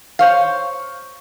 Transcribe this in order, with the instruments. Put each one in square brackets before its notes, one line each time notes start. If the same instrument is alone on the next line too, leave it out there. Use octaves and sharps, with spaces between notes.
[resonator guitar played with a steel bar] C5 C#5 F5